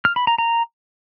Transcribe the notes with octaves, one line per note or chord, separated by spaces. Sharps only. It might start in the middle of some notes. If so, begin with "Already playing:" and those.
F6
B5
A#5
A#5